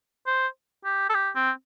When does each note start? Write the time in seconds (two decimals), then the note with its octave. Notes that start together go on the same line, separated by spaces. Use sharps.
0.27 C5
0.85 G4
1.09 A4
1.14 G4
1.35 C4